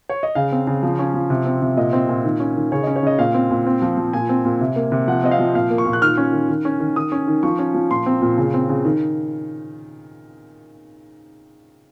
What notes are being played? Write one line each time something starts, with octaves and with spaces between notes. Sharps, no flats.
C#5
D#5
C#3 F5
C4
C#3
F3
C#4
F3
C3
C4
C3
A#2 D#5
C4
A#2
D#3
C#4
D#3
C#3 C#5
C#4 D#5
C#5
C#3 D#5
A#2 F5
C4
A#2
C4
F3
F3
A#2 G#5
C4
A#2
C3
A#3
C3
F3 F#5
C4 D#5
F5
F3
A#2 F5
A#3
C#6
A#2
F#6
D#3 F6
C#4
D#3
D#3
C#4
D#3
D#3 D#6
C#4
D#3
F3 C#6
C#4
F3
A#2 C6
C4
A#2
C#3
C4
C#3
D#3